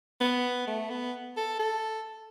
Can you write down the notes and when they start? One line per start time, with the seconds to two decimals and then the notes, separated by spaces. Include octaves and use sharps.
0.21 B3
0.67 A3
0.90 B3
1.37 A4
1.59 A4